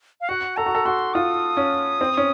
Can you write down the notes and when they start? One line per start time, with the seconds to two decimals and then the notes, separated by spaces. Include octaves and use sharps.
0.21 F5
0.29 F#4 F#5
0.57 A4 A#5
0.66 F#4
0.75 A4
0.85 F#4 C6
1.14 F4 D#6
1.57 C#4
2.01 C4
2.17 C#4